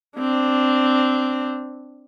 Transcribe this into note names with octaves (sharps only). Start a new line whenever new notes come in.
C4 D4